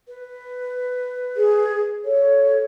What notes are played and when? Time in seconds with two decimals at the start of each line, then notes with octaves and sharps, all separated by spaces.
0.08 B4
1.36 G#4
2.04 A4 C#5